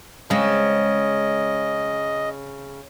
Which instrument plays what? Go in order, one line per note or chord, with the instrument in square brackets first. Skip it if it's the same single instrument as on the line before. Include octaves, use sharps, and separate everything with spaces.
[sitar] C#3 [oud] G#3 C4 [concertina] D#5